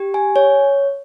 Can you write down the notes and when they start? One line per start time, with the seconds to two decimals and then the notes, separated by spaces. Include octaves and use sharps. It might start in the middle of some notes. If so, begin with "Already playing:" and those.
Already playing: G4
0.14 G#5
0.36 C#5